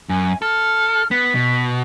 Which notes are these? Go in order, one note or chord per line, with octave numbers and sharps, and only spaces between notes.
F#2 G#5
A4 F6
B3 B6
B2